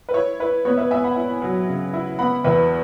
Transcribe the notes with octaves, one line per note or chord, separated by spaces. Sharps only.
B4
E4 C#5
E4 B4
B3 C#5
B4 E5
B3 E5 G#5
F#5 B5
E4
F#3
C#3
E4
B3 F#5 B5
E2 B4 E5